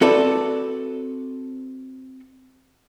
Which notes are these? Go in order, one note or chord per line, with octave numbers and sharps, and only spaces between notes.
C4 F#4 A4 B4 D5 E5